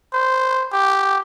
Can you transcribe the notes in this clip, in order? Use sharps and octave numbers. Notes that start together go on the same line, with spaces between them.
C5
G4